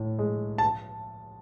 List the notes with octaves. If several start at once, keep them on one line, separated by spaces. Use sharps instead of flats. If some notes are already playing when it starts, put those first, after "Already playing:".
Already playing: A2
G#3
A5